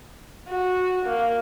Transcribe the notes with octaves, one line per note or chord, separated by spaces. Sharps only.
F#4
A#3